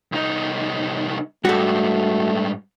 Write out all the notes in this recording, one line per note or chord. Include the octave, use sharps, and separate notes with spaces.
C2 D#4
G#2 G3 A3 F#4 A4